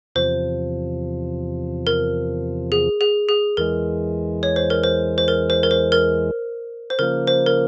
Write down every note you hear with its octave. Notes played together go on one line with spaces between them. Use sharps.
E2 C3 F3 C5
A#4
G#4
G#4
G#4
E2 E3 G#3 A#4
C#5
C5
A#4
C5
C5
A#4
C5
A#4
C5
A#4
C5
C#3 F3 A#3 A#4
C5
A#4